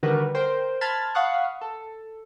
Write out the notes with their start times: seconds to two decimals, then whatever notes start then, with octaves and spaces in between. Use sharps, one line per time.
0.03 D3 D#3 G3 F#4 A#4 B4
0.35 A#4 C5 G5 C6
0.81 A5 B5 C6 F6 G#6 A6
1.15 F5 F#5 B5 C#6 D#6 F#6
1.61 A4